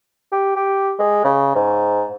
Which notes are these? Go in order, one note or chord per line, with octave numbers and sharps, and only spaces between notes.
G4
G4
G#3
C#3
G#2